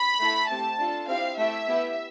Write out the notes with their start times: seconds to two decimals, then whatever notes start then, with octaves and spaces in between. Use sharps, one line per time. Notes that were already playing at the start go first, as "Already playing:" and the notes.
Already playing: B5
0.19 A3 E4 A4
0.49 A3 C4 G4 A5
0.79 D4 F4 A4
1.08 C4 E4 G4 F5
1.37 A3 E4 G4 E5
1.67 B3 E4 G4